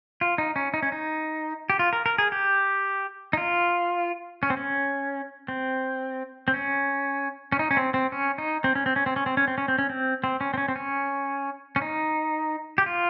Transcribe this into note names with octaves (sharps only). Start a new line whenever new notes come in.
F4
D#4
C#4
D#4
C#4
D#4
G4
F4
A#4
A#4
G#4
G4
D#4
F4
C#4
C4
C#4
C4
C4
C#4
C#4
D#4
C#4
C4
C4
C#4
D#4
C4
C#4
C4
C#4
C4
C#4
C4
C#4
C4
C#4
C4
C#4
C4
C4
C#4
C4
C#4
C4
C#4
C#4
D#4
G4
F4